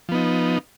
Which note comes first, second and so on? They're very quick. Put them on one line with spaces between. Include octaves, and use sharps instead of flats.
F3 B3 D#4